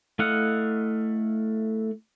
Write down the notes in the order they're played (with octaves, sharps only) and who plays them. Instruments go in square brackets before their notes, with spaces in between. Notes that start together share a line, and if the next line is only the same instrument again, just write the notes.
[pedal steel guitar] A3 E4 D#5 F5 F#5